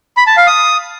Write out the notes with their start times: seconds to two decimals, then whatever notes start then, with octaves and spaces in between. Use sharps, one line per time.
0.17 B5
0.27 A5
0.37 F5
0.47 D#6